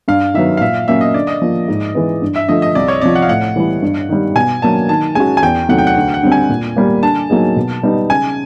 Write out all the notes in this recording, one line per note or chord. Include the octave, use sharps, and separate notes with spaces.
G2 F5
D#3 F#3 B3 E5
F5
A#2 E5
F#3 A#3 C#4 E5
D#5
D3 D5
D#5
F3 A#3
G#2
E3 G#3 B3
G2
E5
D3 F3 A3 D#5
D#5
C2 D5
C#5
C3 F3 D5
F#5
F5
A2 F#5
E3 G3 B3 E4
G2
D#3 G3
B2 G#5
F#3 A#3 D4 A5
D#3 A5
G#3 C#4 F#4 G#5
G#5
E2 G5
C3 D#3 F#3 A3 F#5
G5
F#5
D2
F#5
D3 G3 C4
G#5
A#2
G3 A#3
D3 A5
F#3 A#3 D#4 G#4
B2
G3 B3 D#4
C#3 G#5